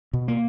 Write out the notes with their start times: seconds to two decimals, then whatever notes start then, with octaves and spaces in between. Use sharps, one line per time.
0.13 B2
0.28 A#3